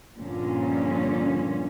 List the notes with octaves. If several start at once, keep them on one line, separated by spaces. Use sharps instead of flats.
G2 A#2 D3 F3 C#4